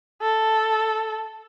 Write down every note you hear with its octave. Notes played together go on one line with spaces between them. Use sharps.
A4